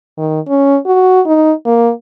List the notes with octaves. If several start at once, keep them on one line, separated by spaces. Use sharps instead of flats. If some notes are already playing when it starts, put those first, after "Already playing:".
D#3
C#4
F#4
D#4
A#3